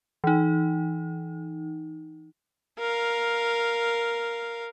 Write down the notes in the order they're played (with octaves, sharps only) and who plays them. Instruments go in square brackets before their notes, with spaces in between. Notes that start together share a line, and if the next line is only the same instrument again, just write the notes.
[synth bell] E3 D#4
[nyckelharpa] A#4 F5